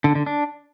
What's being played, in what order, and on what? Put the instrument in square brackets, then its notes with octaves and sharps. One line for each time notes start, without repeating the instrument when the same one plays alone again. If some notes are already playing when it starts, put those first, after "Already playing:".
[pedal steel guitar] D3
D3
D4